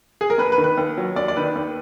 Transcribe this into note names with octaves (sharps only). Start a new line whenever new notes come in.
G#4
A#4
D#2 B4
B4
D#3
B4
D#2
F#3
D#2 D5
D5
D#3 B4
D#2